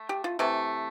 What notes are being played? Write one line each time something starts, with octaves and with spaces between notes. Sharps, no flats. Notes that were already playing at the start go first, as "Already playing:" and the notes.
Already playing: A3
G4
F4
C3 E3 A3